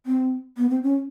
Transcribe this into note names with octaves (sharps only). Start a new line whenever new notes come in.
C4
B3
C4
C#4